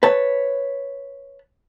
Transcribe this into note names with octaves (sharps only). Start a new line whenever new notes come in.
B4 C#5 A5